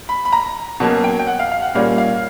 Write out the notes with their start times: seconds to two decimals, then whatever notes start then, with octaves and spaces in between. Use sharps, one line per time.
0.09 B5
0.25 B5
0.33 A#5
0.80 B2 F#3 A#3 C#4 A5
1.04 G5
1.19 G5
1.27 F#5
1.39 F5
1.52 F5
1.62 F#5
1.74 A#2 G3 A#3 C#4 F5
1.98 F5